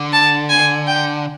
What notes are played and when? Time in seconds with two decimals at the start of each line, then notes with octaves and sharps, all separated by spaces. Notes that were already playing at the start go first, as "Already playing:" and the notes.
Already playing: D3
0.13 A5
0.50 G#5
0.87 G5